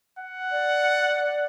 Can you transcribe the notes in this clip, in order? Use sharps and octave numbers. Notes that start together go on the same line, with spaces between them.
F#5
D5